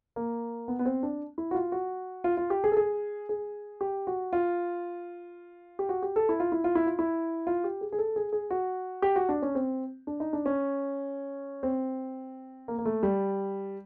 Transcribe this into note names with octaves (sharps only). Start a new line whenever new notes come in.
A#3
B3
B3
C4
D4
E4
F#4
F4
F#4
F4
F4
G4
G#4
A4
G#4
G#4
G4
F#4
F4
G4
F#4
G4
A4
E4
F4
E4
F4
E4
F4
E4
F4
G4
G#4
G#4
A4
G#4
G#4
F#4
G4
F#4
D4
C#4
C4
D4
D#4
D4
C#4
C4
A#3
A#3
A3
G3